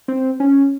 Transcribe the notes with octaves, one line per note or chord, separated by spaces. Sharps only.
C4
C#4